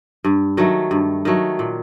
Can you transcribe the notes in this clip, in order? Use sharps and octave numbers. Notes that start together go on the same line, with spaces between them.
G2
D#3 F#3 A3
G2
D#3 F#3 A3
A#2